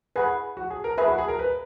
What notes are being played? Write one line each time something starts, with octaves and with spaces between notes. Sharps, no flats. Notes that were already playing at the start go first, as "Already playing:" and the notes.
G#4 B4 F#5 B5
F#4
G#4
A#4
G#4 B4 E5 B5
F#4
G#4
A#4
B4